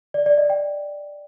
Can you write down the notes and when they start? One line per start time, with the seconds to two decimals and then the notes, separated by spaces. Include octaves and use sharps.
0.14 D5
0.26 D5
0.38 D#5
0.50 G5